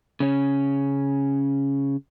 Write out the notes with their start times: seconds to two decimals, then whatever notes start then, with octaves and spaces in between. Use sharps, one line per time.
0.20 C#3 C#4